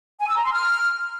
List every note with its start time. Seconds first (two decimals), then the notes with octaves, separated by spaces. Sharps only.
0.19 G#5
0.28 E6
0.36 A#5
0.44 C6
0.52 F6